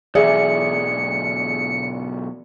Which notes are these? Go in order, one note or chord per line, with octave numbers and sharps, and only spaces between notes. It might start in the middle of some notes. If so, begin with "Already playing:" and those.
B1 E2 G#4 D5 E5 C#7